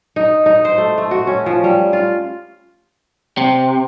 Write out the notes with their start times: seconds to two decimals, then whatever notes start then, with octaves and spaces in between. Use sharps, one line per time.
0.16 D#4
0.46 D#4
0.65 C5
0.78 A3
0.98 A3
1.11 F#4
1.27 C#4
1.46 F3
1.64 G3
1.93 F4
3.38 C3